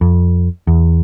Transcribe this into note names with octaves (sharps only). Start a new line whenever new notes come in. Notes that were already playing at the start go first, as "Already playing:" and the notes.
F2
E2